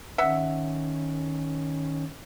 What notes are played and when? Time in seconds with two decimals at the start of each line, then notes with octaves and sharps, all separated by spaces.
0.18 D#3 C#4 E5 F#5